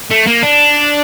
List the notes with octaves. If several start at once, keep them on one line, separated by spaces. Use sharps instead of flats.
A3
A#3
D4